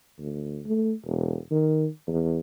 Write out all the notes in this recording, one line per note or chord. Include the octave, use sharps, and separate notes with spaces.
D2
A3
E1
D#3
E2